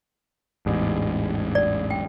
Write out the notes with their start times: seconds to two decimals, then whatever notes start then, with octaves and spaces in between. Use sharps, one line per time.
0.66 A1 E2 G#2
1.55 D5
1.91 G5